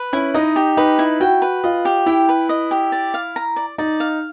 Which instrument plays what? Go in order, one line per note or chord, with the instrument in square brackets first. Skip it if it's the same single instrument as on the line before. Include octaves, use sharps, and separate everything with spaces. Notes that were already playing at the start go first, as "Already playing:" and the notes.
Already playing: [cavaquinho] B4
[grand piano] C#4 [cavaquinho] E4
[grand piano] D#4 [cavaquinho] D#5
[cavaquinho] G4
[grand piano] D#4 [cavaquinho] B4
[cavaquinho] E4
[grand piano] F#4 [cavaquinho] G5
[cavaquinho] B4
[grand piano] F4 [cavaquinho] D#5
[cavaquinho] G4
[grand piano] E4 [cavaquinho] G5
[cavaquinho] B4
D#5
G4
D5
F5
A#5
D5
[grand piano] D#4 [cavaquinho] D5
[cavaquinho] F5